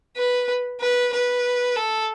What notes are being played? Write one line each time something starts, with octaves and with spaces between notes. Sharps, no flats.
B4
B4
B4
A4